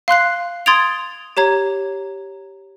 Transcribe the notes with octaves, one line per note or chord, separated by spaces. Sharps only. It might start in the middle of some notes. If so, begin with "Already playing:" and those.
F5 C6 F#6 C7
C6 D#6 G#6 A6 D7 F7
G4 C#5 A#5 G#6